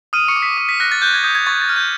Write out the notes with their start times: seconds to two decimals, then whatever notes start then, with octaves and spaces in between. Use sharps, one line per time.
0.13 D#6 F6 D#7
0.28 C#6 C#7
0.36 D6
0.42 B6
0.57 D#6
0.69 B6
0.80 F#6 A#6
0.92 A6
1.02 F#6 G6
1.14 G#6
1.24 D#6 G6
1.35 G#6
1.46 C#6 A6
1.62 A6
1.69 F6
1.76 G6